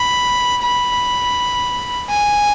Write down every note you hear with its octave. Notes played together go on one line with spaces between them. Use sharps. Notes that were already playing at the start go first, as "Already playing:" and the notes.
Already playing: B5
B5
G#5